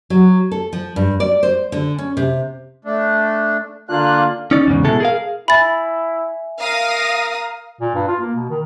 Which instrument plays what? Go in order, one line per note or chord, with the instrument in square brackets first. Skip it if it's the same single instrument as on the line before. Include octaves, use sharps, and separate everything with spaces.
[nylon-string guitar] F#3
A4
F3
G2
D5
C5
D3
C#4
C3
[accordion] A3 D4
[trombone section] D3 D4 F4 [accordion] A#3 F#6
[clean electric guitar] C#4 D#4 D5
E2 G#2 C#3
G#2 B2 G#3 E4 A4
G#4 A#4 F5
[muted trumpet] E4 [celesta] E5 G#5 [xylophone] B5 A6
[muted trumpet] A#4 [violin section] F5 D#6 A#6
[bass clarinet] A#2
G2
F4
A#3
B2
D#3